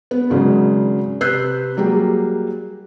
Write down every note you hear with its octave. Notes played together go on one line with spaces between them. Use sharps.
B3
G#1 C#3 F#3 G#3
C3 B4 E6 F#6 G6 C7
F#3 G3 A#3 G#4